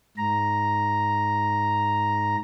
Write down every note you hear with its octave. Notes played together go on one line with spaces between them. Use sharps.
G#2 A#5